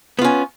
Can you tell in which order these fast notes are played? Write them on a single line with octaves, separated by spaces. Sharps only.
B3 F4 C#4